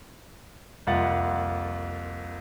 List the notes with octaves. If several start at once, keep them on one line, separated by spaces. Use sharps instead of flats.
C2 F2 A#3 F4 F#5 A6